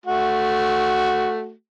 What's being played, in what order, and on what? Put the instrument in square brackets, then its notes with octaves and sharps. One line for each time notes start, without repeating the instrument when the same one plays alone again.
[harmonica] A3 F#4